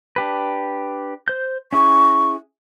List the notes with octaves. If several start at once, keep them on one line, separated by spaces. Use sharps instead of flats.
D4 G4 B4
C5 G6
C#4 E4 G#4 C#6